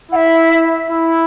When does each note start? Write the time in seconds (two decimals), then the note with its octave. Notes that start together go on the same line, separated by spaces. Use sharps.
0.11 E4 F#5
0.16 E5
0.90 E4